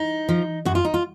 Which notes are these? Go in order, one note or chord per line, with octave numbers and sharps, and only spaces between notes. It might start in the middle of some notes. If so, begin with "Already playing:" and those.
Already playing: D#4
F3
F#2 F#4
F4
D#4
F4